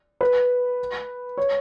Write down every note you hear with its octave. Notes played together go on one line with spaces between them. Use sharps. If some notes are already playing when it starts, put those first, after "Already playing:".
B4
C#5